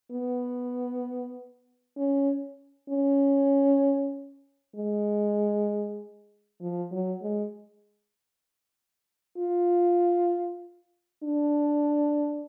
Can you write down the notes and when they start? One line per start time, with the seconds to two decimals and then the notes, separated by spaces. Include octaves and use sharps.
0.11 B3
1.97 C#4
2.90 C#4
4.76 G#3
6.61 F3
6.91 F#3
7.22 G#3
9.38 F4
11.23 D4